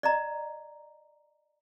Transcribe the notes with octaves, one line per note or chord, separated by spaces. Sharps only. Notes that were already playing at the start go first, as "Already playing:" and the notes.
D5 D#5 A#5